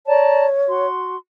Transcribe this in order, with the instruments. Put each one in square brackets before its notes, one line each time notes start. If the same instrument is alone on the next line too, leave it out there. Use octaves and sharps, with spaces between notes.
[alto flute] C#5 [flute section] D5 A5 A#5
[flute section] F#4 C6